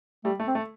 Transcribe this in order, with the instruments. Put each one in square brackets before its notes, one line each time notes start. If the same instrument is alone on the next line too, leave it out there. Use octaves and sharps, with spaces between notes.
[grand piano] G3 [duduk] A3
[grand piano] A3
[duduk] C4
[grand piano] A3